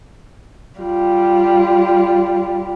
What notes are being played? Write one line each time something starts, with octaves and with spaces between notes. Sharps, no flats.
G3 F4